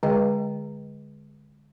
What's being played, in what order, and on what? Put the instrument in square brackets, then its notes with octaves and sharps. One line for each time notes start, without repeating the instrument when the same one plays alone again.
[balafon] D3 G#3 G#4 D#5 G5